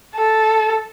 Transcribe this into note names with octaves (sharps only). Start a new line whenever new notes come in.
A4